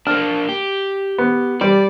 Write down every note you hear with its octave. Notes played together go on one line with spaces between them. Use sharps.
A#3 D4 F6
G4
B3
G3 D5